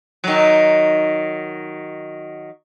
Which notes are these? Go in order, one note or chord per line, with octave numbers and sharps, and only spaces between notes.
D#3 F#3